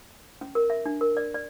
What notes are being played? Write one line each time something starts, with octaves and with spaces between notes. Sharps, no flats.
C#4
A#4
E5
D4
A#4
D5
D5